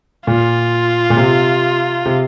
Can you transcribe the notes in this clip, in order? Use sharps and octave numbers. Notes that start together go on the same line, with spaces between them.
A#2 F4
A#2
C3
C3